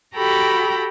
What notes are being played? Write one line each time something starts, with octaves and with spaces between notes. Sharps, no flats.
F#4 G4 A4 G5 A#5 B5